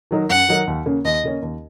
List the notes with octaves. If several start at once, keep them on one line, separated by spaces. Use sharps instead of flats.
D#3 F#3 D#4 A#4
F#2 F#5
D#3 F#3 D#4 A#4
D#2
C#3 A#3 C#4
D#2 D#5
C#3 A#3 C#4
D#2